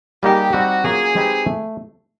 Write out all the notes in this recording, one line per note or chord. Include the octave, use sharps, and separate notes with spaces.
G3 A#3 D#4 G4 G#4
G3 C4 D#4 F#4 G4
F#3 A#3 C#4 F4 G#4 A#4
G#3 C4 D#4 G4 B4
A3